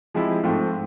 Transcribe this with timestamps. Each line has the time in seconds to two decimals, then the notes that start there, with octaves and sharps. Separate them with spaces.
0.14 F3 G#3 C4 E4 G4
0.43 G#2 F3 A3 C4